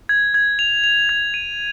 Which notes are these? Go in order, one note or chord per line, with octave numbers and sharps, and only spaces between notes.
G#6
G#6
F7
F7
G#6
D#7